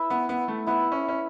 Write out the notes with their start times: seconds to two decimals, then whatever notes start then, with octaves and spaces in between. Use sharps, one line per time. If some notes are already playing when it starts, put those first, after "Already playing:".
Already playing: E4 B4 E5
0.10 B3
0.29 B3
0.48 A3
0.67 B3 E4 B4 E5
0.92 C#4
1.09 C#4